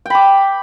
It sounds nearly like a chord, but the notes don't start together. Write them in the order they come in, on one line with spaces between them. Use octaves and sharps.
G5 B5 D6